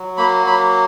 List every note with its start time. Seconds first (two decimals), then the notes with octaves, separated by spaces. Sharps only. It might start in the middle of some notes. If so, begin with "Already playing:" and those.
Already playing: F#3
0.17 A#3 B5
0.47 F#3 B5